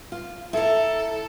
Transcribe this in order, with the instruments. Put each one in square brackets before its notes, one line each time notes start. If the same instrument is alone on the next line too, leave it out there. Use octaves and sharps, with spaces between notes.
[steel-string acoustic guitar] F4
[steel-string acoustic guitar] E4 A#5 [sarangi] A4